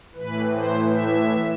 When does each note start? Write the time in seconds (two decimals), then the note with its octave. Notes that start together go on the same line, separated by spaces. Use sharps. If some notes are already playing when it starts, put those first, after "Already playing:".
0.15 A2 E3 B4
0.54 C5
0.91 E5